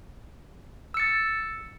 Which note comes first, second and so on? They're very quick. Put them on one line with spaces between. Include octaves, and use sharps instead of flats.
E6 C#7 A6